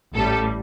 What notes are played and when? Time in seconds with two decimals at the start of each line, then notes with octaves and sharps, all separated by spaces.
0.15 A1 A2 G3 A4